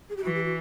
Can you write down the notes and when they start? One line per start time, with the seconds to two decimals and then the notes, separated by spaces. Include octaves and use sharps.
0.09 G#4
0.17 G4
0.24 E3 F#4
0.34 G4
0.44 F#4